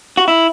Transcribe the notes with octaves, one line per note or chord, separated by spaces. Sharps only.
F#4
E4